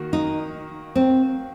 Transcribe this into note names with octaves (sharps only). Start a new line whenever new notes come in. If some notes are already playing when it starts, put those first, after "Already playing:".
Already playing: D#3 A#3 F#4
D#4
C4